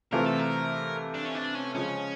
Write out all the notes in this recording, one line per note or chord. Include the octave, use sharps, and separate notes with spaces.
C3 E3 A3 C4 F4 A#4
A4
A#4
D4
C#4
D4
C#4
C#3 F3 G#3 C#4